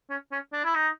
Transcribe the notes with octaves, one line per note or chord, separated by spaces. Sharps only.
C#4
C#4
D4
E4
D#4